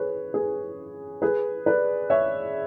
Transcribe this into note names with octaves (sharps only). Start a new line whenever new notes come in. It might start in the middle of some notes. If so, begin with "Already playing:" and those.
Already playing: G#4 B4 C#5
G#4 B4
G#4 B4
B4 D5
C#5 E5